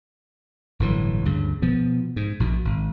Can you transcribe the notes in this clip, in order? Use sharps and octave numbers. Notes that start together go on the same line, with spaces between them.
G1 A2 E3 F#3
D2 G2 C#3
B2 F3 B3
G#2
A#1 B2
G#1